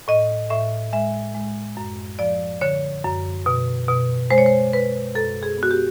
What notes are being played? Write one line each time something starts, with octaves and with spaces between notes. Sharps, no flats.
A2 D#5
A2 E5
G#3 E5
G#3
F#2
F3 D5
D3 C#5
F#2
B2
B2
G#3 C5
C#5
C5
B2 B4
F#2 A4
G#4
B3
F#4
G4